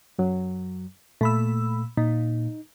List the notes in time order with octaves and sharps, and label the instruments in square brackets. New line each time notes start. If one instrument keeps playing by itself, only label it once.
[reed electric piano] F#2 F#3
[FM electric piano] A#2 B5 E6 [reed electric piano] A3
[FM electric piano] A#2 [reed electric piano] D#4